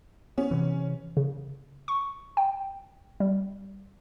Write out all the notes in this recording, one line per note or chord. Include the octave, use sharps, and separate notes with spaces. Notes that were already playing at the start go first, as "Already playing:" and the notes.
B3 C#4
C3 E3
C#3
C#6
G5
G3